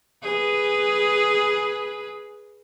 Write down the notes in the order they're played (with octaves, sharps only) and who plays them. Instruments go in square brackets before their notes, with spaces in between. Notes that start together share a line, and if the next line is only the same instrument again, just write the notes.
[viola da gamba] G#4 B4